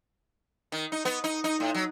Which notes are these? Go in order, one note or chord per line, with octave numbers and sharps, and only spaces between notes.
D#3
D#4
B3
D#4
D#4
A2
F#3